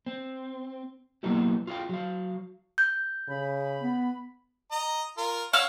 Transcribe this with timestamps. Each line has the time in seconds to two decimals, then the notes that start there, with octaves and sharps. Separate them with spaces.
0.06 C4
1.23 F#3 A#3 B3 D#4 E4 G4
1.67 F4 G#4 A4 F5 G5
1.89 F#3 F5
2.78 G6
3.28 C#3 B5
3.81 B3
4.71 D#5 A#5
5.17 F4 A#4
5.53 C#5 F5 F#5 C#6 E6